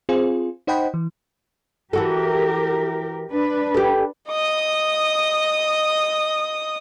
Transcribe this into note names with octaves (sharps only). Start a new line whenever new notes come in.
C4 F4 G#4 C5
D#4 C5 D#5 F#5 G5 B5
E3
E3 F#4 G4 A4 A#4
D4 B4
G4 A4
D#5 D#6